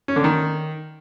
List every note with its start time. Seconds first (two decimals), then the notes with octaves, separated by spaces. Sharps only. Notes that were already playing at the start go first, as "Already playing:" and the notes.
0.08 C#4
0.16 D3
0.24 D#3